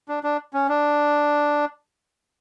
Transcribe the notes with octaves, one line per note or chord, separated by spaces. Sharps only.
D4
D4
C#4
D4